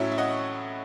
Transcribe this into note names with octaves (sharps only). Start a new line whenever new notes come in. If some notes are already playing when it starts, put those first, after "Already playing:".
Already playing: A2 F#3 C#4 E4 C#5 E5
E5
D#5 F#5